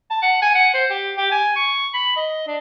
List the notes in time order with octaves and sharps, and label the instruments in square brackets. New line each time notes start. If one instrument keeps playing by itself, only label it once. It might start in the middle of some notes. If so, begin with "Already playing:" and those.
[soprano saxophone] A5
F#5
G#5
F#5
C5
G4
G4
G#5
C#6
B5
D#5
D4